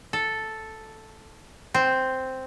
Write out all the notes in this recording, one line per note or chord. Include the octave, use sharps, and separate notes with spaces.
A4
C4